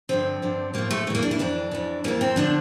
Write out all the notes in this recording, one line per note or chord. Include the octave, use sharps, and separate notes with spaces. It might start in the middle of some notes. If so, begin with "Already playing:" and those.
G2 D3 F3 C4
G2 D3 F3
A2 F3 A#3
A3
E2 E3 A3 A#3
D4
E4
F2 E3 D4
F2 E3
F2 E3 A#3
C4
D3 F3 D4